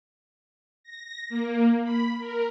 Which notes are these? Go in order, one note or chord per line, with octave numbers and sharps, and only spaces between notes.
A#6
A#3
B5
A#4